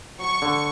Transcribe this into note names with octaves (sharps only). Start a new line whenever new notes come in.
F#3 C#6
D3